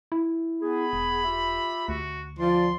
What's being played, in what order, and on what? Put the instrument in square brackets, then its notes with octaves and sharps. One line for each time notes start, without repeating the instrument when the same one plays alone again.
[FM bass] E4
[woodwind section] B3 G#4 [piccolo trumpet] B5
[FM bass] E1
[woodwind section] F4 G4 E5
[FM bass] D2 [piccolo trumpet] F#4
[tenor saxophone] F3 [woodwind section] D5 [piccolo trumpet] C6